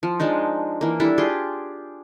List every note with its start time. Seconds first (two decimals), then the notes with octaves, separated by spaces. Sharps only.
0.03 F3
0.20 F3 G#3 D4 D#4
0.81 E3 A#3
1.00 G3 D4 E4 A4
1.18 F4 G4 G#4 C6